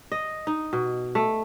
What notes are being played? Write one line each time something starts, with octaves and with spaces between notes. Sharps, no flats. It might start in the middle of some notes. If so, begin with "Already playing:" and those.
D#5
D#4
B2
A3